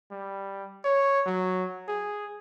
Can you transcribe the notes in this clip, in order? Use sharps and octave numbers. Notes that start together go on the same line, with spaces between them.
G3
C#5
F#3
G#4